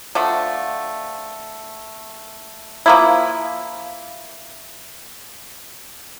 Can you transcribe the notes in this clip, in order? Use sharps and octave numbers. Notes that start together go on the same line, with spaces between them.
D3 F3 A3
F3 A#3 E4